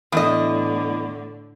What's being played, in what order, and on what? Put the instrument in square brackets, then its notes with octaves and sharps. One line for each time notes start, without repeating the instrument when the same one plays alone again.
[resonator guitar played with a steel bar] E2 D#5 [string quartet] A2 D3